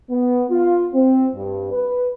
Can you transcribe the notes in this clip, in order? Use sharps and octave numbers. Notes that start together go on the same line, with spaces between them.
B3
F4
C4
G2
B4